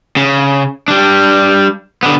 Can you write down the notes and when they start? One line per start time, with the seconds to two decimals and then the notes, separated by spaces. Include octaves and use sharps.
0.17 C#3
0.88 G3 D4
2.03 D3 B3